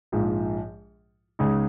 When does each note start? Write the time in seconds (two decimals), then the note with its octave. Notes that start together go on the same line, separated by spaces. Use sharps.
0.12 A#1 G#2 F3
1.39 C#2 C#3 G#3 D#4